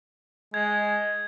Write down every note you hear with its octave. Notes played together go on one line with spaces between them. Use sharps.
G#3 G#6